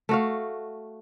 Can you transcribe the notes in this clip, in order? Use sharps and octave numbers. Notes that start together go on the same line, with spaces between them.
A3 F#4 F5